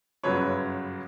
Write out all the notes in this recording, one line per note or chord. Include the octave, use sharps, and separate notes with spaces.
G1 F#2 C#3 F#3 B4 C#5